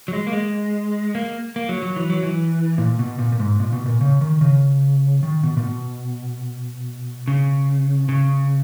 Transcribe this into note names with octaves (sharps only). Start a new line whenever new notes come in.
F#3
G#3
A#3
G#3
A#3
A#3
F#3
F#3
E3
F#3
E3
A#2
B2
A#2
A#2
G#2
A#2
B2
A#2
C#3
D#3
C#3
D#3
B2
A#2
B2
C#3
C#3